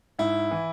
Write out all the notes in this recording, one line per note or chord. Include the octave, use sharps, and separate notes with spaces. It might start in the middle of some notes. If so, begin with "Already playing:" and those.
G#2 E4
E3